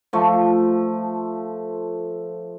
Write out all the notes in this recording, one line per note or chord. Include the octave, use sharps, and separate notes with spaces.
F3 A3